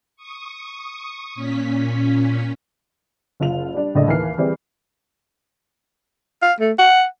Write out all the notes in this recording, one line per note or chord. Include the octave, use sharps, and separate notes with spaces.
C#6 D#6
A#2 C#4 B6
F#1 F4 F7
G3 D4
F#1 C#2 A2 D3 D5 D#5
D#2 E3 A#4 F6 C7
E3 G3 C4 G#4
F5
A3
F#5